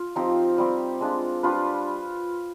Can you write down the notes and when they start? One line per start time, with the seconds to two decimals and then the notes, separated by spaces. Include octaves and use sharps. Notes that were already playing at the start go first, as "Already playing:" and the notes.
Already playing: F4
0.16 F3 C4 D#4 G4
0.58 G3 C4 G4
1.01 G#3 D4 F4
1.43 G3 D4 F4 B4